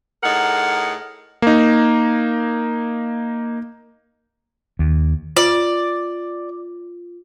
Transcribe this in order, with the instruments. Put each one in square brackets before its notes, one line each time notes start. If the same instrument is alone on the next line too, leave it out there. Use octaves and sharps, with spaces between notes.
[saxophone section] A2 D#4 G#4 A#4 F#5
[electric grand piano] A#3 D#4
[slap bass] D#2
[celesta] F4 [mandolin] D5